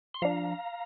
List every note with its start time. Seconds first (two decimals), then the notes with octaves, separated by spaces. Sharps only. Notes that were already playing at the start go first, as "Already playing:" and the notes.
0.14 C6
0.22 F3 D4 F5 A#5